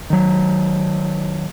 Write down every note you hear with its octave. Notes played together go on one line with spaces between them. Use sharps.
D#3 F#3